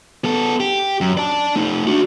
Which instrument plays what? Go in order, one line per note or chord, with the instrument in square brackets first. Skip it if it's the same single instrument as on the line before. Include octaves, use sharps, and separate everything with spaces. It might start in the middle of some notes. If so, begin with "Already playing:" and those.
[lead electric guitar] B3 A4
G4
F#2
D5 A5
A3 D#4
D4 F#4